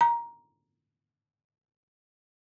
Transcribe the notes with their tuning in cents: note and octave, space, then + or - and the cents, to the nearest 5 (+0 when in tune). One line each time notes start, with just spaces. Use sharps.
A#5 +10